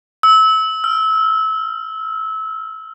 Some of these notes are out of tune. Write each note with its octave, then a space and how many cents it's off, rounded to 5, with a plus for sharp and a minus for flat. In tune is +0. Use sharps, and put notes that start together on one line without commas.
E6 -25
E6 +45